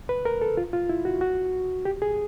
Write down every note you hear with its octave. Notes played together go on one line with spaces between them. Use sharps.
B4
A#4
A4
F4
F4
E4
F#4
F#4
G4
G#4